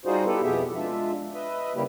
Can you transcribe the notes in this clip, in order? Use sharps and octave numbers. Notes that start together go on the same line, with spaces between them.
G3 D#4 F4 F#4 G#4 C5
B3 E4 G4 A4 B4
F2 B2 B3 G4 G#4 E5
G#3 D4 F4 E5
B4 D#5 E5
C#3 G3 A#3 E4 G4